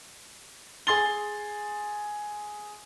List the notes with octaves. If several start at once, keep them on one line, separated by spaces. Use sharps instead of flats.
G#4 C6 A6 G7